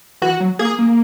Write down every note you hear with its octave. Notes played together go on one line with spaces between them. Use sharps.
E3 F#4
F#3
A#3 G#4
A#3